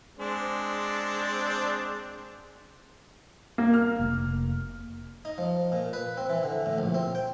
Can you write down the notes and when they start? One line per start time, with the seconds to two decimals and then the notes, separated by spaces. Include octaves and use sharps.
0.18 G#3 C4 D4
3.58 A#3
3.74 F6
3.99 F1 A#3
5.25 D#4
5.38 F3
5.72 A#2
5.93 B4
6.17 C4
6.29 E3
6.43 D3
6.66 A2
6.78 A#1
6.94 C4
7.15 G5